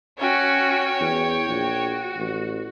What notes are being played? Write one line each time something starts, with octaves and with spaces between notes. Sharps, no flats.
C#4 F#4 C#5 G5
E2
A#1 F#4
A1